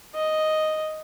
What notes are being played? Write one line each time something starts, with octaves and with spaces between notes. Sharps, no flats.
D#5